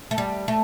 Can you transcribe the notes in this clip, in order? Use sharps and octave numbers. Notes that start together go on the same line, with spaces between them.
A3
G3
A3